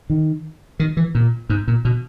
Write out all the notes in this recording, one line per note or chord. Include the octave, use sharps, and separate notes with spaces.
D#3
D#3
E3
A#2
G#2
A#2
B2